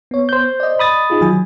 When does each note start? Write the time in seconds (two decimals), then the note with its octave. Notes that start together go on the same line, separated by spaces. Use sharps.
0.11 B3 C#5
0.29 C5 G6
0.60 D5 D#5
0.79 B5 D#6 A6
1.10 D#4 F4 G#4
1.21 D#3 F#3 G#5